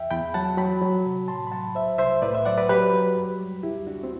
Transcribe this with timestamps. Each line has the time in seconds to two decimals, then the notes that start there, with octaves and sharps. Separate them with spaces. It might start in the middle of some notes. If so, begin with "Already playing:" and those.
Already playing: E2 E5 G5
0.11 E2 G5 B5
0.34 F#3 F#5 A5
0.58 F#3 G5 B5
0.82 F#3
1.05 C3
1.28 A2 A5 C6
1.47 B5
1.51 F#3 F#5 A5
1.75 C2 C5 E5
1.98 C2 C5 E5
2.22 A2 B4 D5
2.34 C5 E5
2.45 F#3 D5 F#5
2.58 B4 D5
2.69 F#3 G4 B4
2.94 F#3
3.16 F#2
3.40 G3
3.63 D2 E4 G4
3.86 D2 D4 F#4
4.03 C4